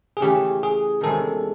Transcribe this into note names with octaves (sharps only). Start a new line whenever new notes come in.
G#4
C#3 E3 A3 C#4 G4
G#4
E2 C3 D#3 G#3 C#4 A4